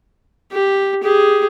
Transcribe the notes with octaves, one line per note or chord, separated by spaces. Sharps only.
G4
G4 G#4